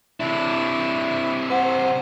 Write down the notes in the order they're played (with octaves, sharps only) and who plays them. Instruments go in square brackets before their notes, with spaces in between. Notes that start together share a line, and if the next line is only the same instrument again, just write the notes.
[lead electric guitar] C3 D4 [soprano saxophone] E4
[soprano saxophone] C5 [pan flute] F#5